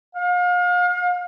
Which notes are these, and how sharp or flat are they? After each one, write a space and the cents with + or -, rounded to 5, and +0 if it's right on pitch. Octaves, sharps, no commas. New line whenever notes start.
F5 +35